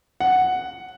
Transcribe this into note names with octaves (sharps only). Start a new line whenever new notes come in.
F#5